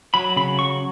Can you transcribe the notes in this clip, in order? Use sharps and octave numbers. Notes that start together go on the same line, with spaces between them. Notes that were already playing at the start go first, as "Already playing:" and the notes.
F#3 B5
C#3 B5
F#3 C#6